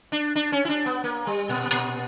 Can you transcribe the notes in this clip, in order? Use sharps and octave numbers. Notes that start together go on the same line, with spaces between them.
D4
D4
C#4
E4
D4
B3
A#3
G3
A#2
A#2